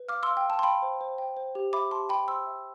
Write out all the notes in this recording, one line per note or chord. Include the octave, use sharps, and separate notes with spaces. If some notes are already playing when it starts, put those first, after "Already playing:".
Already playing: B4
F5 D6 F6
F5 C6 E6
G5
F5 A5
C6
F5 G5 B5
C5
C5
G5
C5
G4
E5 B5 D6
G4 A5 C6
G4 G5 B5
C5 C6 E6
E5